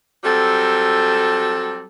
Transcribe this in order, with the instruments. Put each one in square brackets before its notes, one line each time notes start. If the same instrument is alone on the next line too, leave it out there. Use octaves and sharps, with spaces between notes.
[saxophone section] F#3 G3 C4 A4